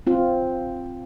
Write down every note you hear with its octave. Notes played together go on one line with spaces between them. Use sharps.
C4 F4